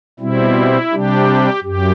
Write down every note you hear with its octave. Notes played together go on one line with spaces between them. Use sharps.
B2 G3 C4 E4
C3 G3 D4 G4
F#2 G4